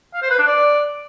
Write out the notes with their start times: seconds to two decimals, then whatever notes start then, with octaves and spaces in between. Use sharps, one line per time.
0.14 F5
0.22 C5
0.30 B4
0.38 D4
0.47 D5